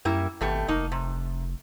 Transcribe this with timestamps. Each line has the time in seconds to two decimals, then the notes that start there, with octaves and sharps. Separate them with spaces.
0.05 F#2 G3 A#3 E4
0.41 G#1 B2 A3 G4
0.68 F1 A#3 D#4
0.92 C3